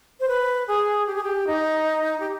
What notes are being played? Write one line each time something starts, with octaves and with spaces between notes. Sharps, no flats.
C5
B4
G#4
G4
G#4
G4
D#4
G4